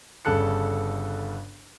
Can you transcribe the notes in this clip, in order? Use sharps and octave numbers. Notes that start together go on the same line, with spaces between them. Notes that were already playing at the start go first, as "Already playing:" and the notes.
G1 G2 C#3 A4 F#6 C#7